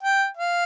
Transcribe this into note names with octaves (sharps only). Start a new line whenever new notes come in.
G5
F5